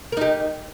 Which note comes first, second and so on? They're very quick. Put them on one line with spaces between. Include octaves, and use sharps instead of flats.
A#4 D#4 G4